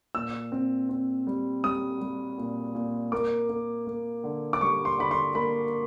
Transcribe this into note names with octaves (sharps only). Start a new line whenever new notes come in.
A#2 E6
C4
C4
G3
G3 D#6
G3
A#2
A#2
A#3 D6
A#3
A#3
D3
D6
G3 C#6
C6
D3 B5
C6
A#3 B5